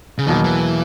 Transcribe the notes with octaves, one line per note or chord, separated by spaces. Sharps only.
C#3
E2 B2 D#3 F#3 A#3
E3